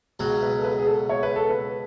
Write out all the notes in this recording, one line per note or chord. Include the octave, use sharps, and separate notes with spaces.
C#2 B2 F#3
B4
A4
B4
G#4
A4
C#5
B4
A4
B4